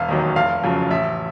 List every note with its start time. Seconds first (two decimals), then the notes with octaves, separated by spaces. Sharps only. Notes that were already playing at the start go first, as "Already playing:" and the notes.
Already playing: E1 F5
0.09 D#2 D#3 F#3
0.36 F1 F5
0.64 F2 C#3 F#3
0.91 A1 E5